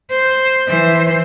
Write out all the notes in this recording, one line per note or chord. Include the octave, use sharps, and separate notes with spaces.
C5
E3 C5